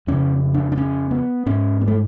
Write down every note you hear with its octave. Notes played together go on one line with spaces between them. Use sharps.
F2 C#3 C#4
D4
D4
C#4
B3
G#2 C#4
B3
A3